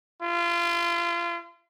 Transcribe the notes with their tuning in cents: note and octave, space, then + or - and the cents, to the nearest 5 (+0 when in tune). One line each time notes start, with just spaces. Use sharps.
F4 -30